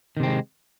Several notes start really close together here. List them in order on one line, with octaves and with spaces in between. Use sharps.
D#3 C3 C4 G#3